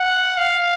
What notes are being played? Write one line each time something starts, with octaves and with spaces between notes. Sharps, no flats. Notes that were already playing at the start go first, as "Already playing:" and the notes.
Already playing: F#5
F5